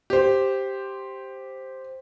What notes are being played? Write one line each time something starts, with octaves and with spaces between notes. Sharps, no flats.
G4 C5